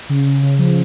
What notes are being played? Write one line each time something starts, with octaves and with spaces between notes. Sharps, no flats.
C#3
C#3
C#3
F3